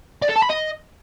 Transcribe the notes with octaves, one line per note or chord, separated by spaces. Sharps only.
D5
A4
A5
B5
D#5